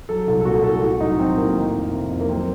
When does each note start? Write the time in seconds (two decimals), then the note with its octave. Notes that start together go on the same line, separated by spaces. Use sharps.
0.09 F#3 A4
0.27 C2 A4
0.41 A4
0.45 A#2 F#4
0.64 C2 A4
0.82 A2 F#4
1.00 F#3 D#4
1.19 F#3 C4
1.37 A2 A#3
1.56 D#3
1.75 F2
1.93 C3
2.11 F2
2.21 A#3
2.28 F#3 C4